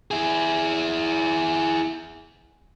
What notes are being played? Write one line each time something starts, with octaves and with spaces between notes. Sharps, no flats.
E4 G#4